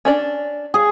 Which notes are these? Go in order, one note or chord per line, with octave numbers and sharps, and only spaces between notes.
C#4 D4 D5
G#4